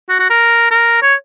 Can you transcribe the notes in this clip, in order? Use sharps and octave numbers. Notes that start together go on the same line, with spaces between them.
F#4
F#4
A#4
A#4
C#5